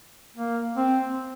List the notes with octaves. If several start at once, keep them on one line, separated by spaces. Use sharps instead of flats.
A#3
C4